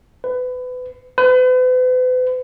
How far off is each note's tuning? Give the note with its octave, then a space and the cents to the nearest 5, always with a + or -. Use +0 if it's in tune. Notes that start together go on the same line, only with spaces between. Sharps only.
B4 +25
B4 +40